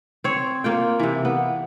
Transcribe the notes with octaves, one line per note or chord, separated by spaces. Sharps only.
C4 C#5
A#3 F4 G5
C3 E3
B3